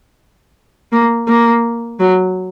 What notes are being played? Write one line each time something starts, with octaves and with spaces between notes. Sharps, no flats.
A#3
A#3
F#3